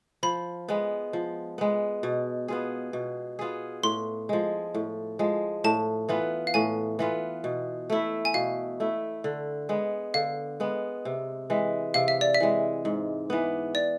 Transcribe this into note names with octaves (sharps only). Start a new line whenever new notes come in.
F3 B5
G#3 B3
F3
G#3 B3
B2
B3 F4 G#4
B2
B3 F4 G#4
A2 C6
F3 G#3
A2
F3 G#3
A2 A5
E3 B3 F4
F5
A2 G#5
E3 B3 F4
B2
A3 E4
G#5
B2 F5
A3 E4
D3
G#3 B3
D3 F5
G#3 B3
C3
E3 G#3
C3 F5
E5
D5
E5
E3 G#3
G#2
E3 B3
D5